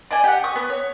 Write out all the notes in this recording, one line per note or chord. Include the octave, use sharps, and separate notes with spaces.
D5 D#5 G#5
G4 F#5
C#6 D#6
B3
C#5